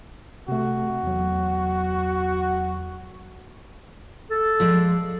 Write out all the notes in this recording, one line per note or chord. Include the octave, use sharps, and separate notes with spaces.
C3 A3 F#4
E2 F#3
A4
F3 G#3 D5